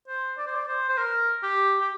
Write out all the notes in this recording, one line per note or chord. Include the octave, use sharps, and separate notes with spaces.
C5
D5
C5
D5
C5
C5
A#4
G4
G4